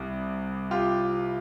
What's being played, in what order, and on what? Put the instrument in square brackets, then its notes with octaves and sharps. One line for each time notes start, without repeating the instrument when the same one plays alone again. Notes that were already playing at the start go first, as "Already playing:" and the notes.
Already playing: [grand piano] C2 G3
F4 G4